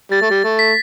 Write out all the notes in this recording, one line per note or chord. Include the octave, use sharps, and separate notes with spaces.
G3 A6
A3
G3
A3
B6